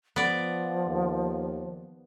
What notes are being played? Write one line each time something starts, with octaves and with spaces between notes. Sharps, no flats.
F3 B3 D5
D#2